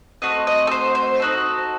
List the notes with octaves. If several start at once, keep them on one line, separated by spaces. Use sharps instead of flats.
A3 C4 F#4 D#5
D#5
A4
C5
C5
D#4 F#4 A4